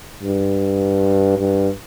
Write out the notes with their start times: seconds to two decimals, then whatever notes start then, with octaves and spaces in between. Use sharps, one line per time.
0.23 G2
1.38 G2